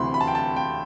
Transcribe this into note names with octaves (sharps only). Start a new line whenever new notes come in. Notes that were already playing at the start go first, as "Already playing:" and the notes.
Already playing: D2 C3 E3 B5 C6
B5
A5
G5
A5
G5